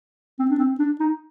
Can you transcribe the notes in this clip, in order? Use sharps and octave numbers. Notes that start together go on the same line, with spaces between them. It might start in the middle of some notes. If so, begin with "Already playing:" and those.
C4
D4
C4
D4
D#4